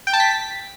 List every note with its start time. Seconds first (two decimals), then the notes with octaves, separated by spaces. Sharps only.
0.07 G5
0.13 A5
0.20 B6